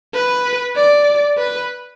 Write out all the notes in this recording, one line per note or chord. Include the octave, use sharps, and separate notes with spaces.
B4
D5
B4